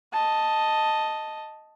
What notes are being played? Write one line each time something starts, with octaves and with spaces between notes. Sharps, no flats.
D#5 A5